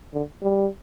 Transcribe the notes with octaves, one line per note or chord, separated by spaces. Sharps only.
D3
G3